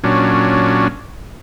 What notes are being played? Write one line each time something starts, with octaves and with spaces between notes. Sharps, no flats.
A#2 F#3 C#4 D4